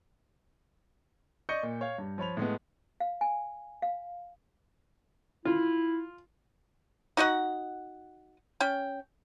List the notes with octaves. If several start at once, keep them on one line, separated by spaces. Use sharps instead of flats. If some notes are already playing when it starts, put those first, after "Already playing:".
D5 D#5 C#6 G6 C#7
A#2
C#5 F5
G2
F3 C#5 B5 F7
A2 G#3 B3
F5
G#5
F5
E4 F4
D#4 F#4 D#5 F#5
C#4 G5